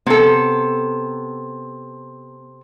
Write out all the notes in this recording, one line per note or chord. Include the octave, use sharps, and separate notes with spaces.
C3 B3 A4